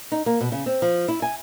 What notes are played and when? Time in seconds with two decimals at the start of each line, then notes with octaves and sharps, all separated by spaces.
0.12 D#4
0.26 A#3
0.41 B2
0.52 C#3
0.66 C4
0.82 F3
1.08 E4
1.22 G#5